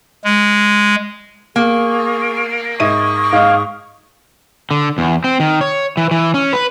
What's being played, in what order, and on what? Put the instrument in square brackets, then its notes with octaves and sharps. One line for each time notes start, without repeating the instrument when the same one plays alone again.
[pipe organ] G#3
[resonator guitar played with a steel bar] A#3 [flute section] G#4 C#6
[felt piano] G#2 E5 D#7 [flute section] C#6 D#6
[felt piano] G#2 D#5 [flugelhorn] F5
[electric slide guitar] D3
E2
C4
D#3
C#5
E3
E3
C#4
B4